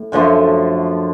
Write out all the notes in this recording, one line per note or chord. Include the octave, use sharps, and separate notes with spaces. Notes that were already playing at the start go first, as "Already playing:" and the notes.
Already playing: A2
F#2 D3 F3 A3